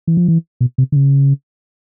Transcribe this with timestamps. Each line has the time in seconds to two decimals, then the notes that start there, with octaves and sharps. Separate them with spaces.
0.07 E3
0.17 F3
0.28 E3
0.61 B2
0.78 C3
0.92 D3
0.96 C#3